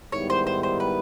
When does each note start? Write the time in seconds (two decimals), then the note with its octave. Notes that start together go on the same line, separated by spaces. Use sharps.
0.12 G#2 D#3 G3 B3 E4 C#5
0.30 C5
0.47 C5
0.63 C5
0.80 B4